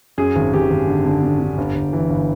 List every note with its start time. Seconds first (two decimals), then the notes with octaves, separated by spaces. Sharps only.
0.18 F#2 G#4
0.36 G#1
0.53 G#1 G4
0.70 G#1
0.87 D3
1.06 D3
1.23 D3
1.40 D3
1.58 G1
1.75 G1
1.93 E3
2.10 G1